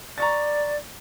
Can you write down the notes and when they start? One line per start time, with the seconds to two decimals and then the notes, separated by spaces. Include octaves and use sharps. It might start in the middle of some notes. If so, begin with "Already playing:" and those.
0.18 D5 A#5 C#6 A6